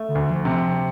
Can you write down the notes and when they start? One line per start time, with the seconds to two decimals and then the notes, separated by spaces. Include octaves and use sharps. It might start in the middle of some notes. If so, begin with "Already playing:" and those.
Already playing: A3
0.09 D3
0.15 D2
0.30 F3
0.45 C3
0.52 F3